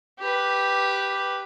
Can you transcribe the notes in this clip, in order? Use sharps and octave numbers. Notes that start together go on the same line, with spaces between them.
G4 B4